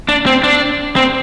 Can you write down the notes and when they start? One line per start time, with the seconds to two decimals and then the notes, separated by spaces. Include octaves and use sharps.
0.09 D4
0.26 C4
0.43 D4
0.96 C4